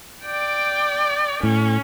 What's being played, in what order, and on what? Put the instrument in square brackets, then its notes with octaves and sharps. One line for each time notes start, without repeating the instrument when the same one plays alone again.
[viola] D5 G5
[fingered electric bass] A2 [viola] C#4